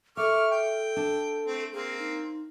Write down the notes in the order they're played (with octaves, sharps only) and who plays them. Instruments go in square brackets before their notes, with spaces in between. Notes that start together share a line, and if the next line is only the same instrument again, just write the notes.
[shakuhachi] A4 [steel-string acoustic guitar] E5 [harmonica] C#6 D6 F6
[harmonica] G5
[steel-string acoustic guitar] D4
[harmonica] A3 C4
[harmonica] A#3 C4 [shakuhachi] G#4
[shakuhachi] D#4